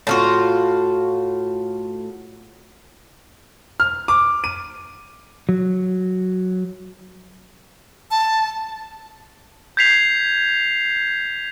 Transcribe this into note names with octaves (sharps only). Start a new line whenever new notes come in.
A2 F4 F#4
F6
D6
D#7
F#3
A5
G6 G#6 B6 C7 F7